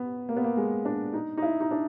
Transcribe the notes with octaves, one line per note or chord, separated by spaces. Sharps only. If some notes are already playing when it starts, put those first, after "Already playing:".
Already playing: B3
A#3
B3
A#3
G#3
D4
D#4
D#4
E4
D#4
D4